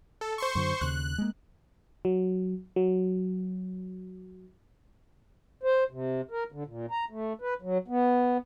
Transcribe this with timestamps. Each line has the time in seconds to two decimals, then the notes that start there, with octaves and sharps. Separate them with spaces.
0.21 A4
0.38 C5 C6 C#6
0.55 F#2 D3 F#3
0.81 D#2 C#3 F#6
1.18 G#3 A#3
2.05 F#3
2.76 F#3
5.63 C5
5.90 C3
6.31 A#4
6.52 D3
6.66 A#2
6.91 A#5
7.10 A3
7.42 B4
7.62 F#3
7.88 B3